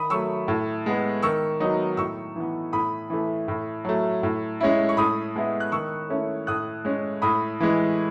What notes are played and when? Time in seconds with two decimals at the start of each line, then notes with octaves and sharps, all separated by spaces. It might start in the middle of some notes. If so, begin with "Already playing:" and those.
Already playing: D#3 B5 D#6
0.10 F#3 A3 C#6 E6
0.48 A2
0.86 G#3 B3
1.23 D#3 C#6 E6
1.60 F#3 B3 D#4
1.97 A2 C#6 E6
2.36 E3 B3
2.73 A2 B5 D#6
3.10 E3 A3
3.48 A2
3.85 F#3 A3
4.23 A2
4.61 G#3 C#4 E4
4.89 C#6
4.97 A2 B5 D#6
5.36 G#3 B3 E4
5.60 F#6
5.72 D#3 C#6 E6
6.09 A3 C#4 E4
6.47 A2 D#6 F#6
6.85 G#3 C#4
7.22 A2 B5 D#6
7.60 E3 G#3